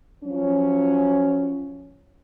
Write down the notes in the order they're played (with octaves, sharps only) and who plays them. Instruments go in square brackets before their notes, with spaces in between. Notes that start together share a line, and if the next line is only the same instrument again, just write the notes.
[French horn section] F3 F#3 C#4